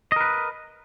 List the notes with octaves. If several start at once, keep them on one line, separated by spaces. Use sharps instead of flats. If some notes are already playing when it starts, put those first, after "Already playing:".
A#4 B4 D#5